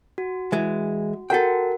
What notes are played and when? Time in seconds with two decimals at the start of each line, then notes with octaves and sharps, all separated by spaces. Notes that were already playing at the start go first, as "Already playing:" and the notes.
0.18 F#4
0.52 E3 G#3
1.30 F#4 A4 A#4 F#5 G5